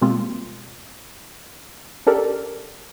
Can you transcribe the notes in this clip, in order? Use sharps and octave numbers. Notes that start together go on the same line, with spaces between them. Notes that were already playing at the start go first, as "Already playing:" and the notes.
B2 G3 G#3 A#3 C4 F4
C#4 D4 G4 A4 A#4 D5